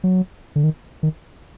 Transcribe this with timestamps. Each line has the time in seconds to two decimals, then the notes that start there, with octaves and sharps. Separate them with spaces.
0.04 F#3
0.56 D3
0.64 D#3
1.03 D#3